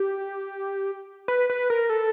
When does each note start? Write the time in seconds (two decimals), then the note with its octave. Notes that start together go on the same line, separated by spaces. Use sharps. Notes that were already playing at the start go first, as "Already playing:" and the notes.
Already playing: G4
1.28 B4
1.50 B4
1.70 A#4
1.90 A4